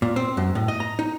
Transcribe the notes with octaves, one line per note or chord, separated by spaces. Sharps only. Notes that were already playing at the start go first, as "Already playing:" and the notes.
A#2
C4
F#2
A2
D#5
A#5
D#4